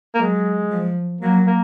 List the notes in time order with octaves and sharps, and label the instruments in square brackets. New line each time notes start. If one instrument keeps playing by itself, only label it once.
[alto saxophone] A#3
[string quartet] F#3 [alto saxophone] G#3
[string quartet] F3
[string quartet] F#3 [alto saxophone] A#3
[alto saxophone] A#3